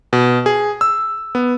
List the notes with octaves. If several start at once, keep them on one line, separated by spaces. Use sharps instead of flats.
B2
G#4
E6
B3